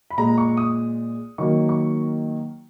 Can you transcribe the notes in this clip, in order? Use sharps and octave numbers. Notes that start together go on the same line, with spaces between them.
B5
A#2 G#3 A#5
C#6
D#6
D#3 F#3 A#3 C#6
C#6